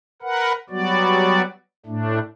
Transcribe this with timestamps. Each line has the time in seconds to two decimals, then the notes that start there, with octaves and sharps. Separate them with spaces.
0.22 A#4 B4 F#5
0.70 F#3 G3 B3 F#4 D5
1.86 A2 A3 D4